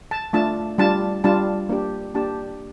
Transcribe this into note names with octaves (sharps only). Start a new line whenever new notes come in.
A5
A3 D4 F4 A5
G3 D4 F4 A5
G3 D4 F4 A5
A#3 D4 G4
A#3 D4 G4 A5